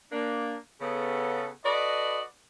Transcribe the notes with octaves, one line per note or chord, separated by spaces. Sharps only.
A#3 D4
C#3 B3 A4
F#4 A4 B4 D5 D#5